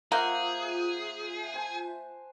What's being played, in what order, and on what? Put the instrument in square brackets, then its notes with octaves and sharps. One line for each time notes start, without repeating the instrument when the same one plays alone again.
[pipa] A#3 [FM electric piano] F4 E5 G6 [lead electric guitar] G#4 [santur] C5 F#5
[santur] C5 G#5 A5